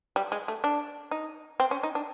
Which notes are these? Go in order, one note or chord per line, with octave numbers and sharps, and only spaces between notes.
G3
G#3
A3
D4
D#4
C4
C#4
D#4
D4